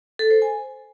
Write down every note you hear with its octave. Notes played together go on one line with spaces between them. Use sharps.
A4
C5
G#5